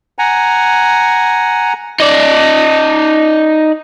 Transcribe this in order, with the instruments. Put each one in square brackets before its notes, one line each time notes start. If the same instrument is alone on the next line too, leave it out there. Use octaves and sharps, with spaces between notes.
[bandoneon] F#5 G#5 A#5
[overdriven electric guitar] D#4 D5